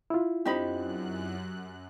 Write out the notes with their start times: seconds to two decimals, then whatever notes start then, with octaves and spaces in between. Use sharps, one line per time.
0.10 E4 F4
0.45 F#2 C4 D4 D#4 G4 D#5 B5 F#6